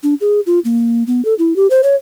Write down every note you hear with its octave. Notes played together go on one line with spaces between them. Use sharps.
D4
G#4
F4
A#3
B3
A4
E4
G4
C5
C#5